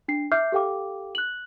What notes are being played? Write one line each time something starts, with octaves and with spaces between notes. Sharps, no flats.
D4 C7
E5 D6 F6 G6 C7
G4 A4 F5 G5 D6
F#6 F#7